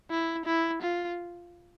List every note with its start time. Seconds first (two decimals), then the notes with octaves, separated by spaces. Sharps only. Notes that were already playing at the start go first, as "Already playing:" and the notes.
0.11 E4
0.46 E4
0.82 F4